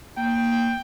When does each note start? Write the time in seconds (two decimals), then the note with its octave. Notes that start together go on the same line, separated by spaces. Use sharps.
0.17 A#3 G5